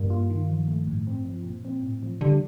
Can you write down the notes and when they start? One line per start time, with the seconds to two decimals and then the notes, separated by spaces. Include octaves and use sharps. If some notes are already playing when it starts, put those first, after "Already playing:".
Already playing: G2 A#3
0.10 F4
0.30 D#3
0.50 F3
0.68 A3
0.87 A2
1.07 C4
1.25 F3
1.44 A#2
1.65 C4
1.83 A2
2.03 F3
2.21 D3 G3